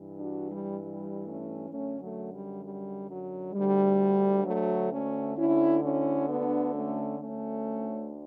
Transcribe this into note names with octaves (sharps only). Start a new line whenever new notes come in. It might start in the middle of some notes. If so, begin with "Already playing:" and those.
Already playing: G2 E3
D4 F#4
G3
G3
A3 C#4
F#2 D3 A3 C#4
F#3 A3
G3
G3
F#3
D2 D3 G3
F#3 A3
A3 C#4
D2 D3 C#4 E4
C#4 E4
B3 D4
A3 C#4
D2 D3 A3 C#4